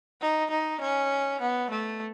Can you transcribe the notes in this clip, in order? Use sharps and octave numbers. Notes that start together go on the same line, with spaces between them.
D#4
D#4
C#4
B3
A3